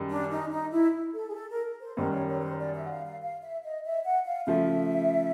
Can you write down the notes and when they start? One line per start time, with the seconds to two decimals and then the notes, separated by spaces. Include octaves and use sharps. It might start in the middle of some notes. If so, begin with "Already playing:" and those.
Already playing: F#2 D#3 G3
0.10 D4
0.30 D#4
0.51 D#4
0.72 E4
1.14 A4
1.29 G#4
1.34 A4
1.50 A#4
1.81 C5
1.96 F#2 D#3 G3 C5
2.12 C#5
2.29 C#5
2.39 B4
2.44 C5
2.59 D5
2.75 E5
2.84 F#5
2.91 F5
3.06 F5
3.22 F5
3.43 E5
3.64 D#5
3.85 E5
4.05 F#5
4.26 F5
4.46 C#3 F3 A3 E5